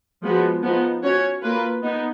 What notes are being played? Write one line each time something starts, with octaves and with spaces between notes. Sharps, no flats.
F3 G#3 B3 F#4
F3 B3 D#4
C#4 F#4 C#5
A#3 F4 B4
B3 D#4